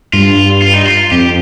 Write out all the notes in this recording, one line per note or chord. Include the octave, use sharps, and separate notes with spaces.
G2 F4
F4
D#4
F4
F2 G4